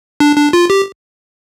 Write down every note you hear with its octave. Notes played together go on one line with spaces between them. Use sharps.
D4
D4
F4
G4